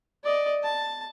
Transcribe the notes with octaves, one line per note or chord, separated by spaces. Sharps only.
D5 D#5
A5